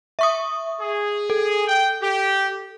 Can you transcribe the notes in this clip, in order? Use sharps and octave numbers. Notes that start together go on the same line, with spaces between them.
E5 C#6 D#6
G#4
A4
G5
G4